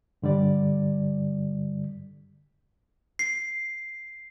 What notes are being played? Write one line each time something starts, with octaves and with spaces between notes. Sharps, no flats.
G2 D3 G3 D5
C7